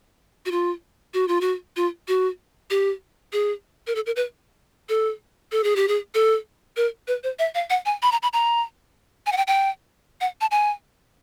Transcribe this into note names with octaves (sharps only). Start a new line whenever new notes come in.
F#4
F4
F#4
F4
F#4
F4
F#4
G4
G#4
A#4
A4
A#4
B4
A4
A4
G#4
G4
G#4
A4
A#4
B4
C5
E5
F5
F#5
G#5
B5
A#5
B5
A#5
G#5
F#5
G5
G5
F#5
A5
G#5